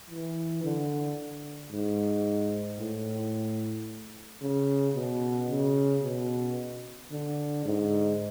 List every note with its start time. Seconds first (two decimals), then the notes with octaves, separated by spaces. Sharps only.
0.10 E3
0.64 D3
1.72 G#2
2.79 A2
4.42 C#3
4.95 B2
5.49 C#3
6.03 B2
7.12 D3
7.65 G#2